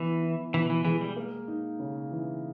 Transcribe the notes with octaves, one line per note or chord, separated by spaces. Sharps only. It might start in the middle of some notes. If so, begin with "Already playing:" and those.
Already playing: E3 B3
E4
B2 E3
E3
E3 G#3
G3
A#3
D#4
C#3
E3